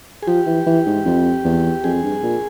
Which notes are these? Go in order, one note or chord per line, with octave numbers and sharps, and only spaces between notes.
G#4
F3 G4
E3
E3
G#2
F2
E2
F2 G#4
G2
A#2